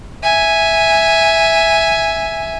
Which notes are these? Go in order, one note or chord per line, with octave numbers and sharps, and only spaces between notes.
E5 G#5